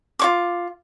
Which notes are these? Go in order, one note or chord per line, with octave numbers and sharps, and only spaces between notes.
F4 C#5 D6